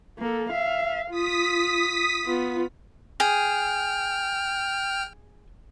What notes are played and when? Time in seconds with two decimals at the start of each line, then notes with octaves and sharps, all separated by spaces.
0.18 A#3 A4
0.50 E5 F5
1.11 F4 D#6 B6
2.25 B3 F4
3.20 G#4 G5 F6